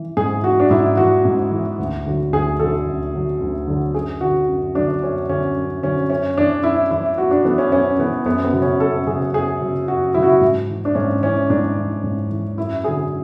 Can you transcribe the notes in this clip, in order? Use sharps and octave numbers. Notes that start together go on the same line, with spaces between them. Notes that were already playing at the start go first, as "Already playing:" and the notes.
Already playing: E3
G#2 G#4
E3 F#4
D4
G#2 E4
E3 F#4
G#2
E3
D2
D3 F#3
D2 G#4
D3 F#3 A4
D2
D3 F#3
D2
D3 F#3
F#2 G#4
D3 F#3 F#4
F#2
D3 F#3 D4
F#2 C#4
D3 F#3 C#4
F#2
D3 F#3 C#4
F#2 C#4
E3 D4
F#2 E4
E3 E4
F#2 F#4
D4
E3 B3
C#4
F#2 C#4
E3 B3
F#2 B3
B3
C#3 F#3
C#4
F#2 A4
C#3 F#3 G#4
F#2 G#4
C#3 F#3
F#2 F#4
C#3 F#3 E4 F#4
E4
G#2
E3
D4
G#2 C#4
E3 C#4
G#2 D4
E3
G#2
E3
F#2 E4
D3 F#3 G#4